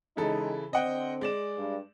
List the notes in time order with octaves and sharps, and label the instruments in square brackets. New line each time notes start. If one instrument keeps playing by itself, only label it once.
[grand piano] C#3 E3 A4 [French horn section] G#3 D#4
[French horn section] D3 C4 [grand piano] D#5 F#5 G5
[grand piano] G#3 D5 E7
[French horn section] G2